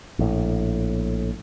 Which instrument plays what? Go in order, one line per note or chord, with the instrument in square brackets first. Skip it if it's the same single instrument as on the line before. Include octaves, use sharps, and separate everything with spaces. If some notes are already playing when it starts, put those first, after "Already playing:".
[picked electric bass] A#1 A2